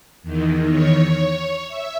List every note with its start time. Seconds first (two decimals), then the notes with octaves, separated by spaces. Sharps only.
0.23 E2 D#3
0.71 C#5
1.68 E5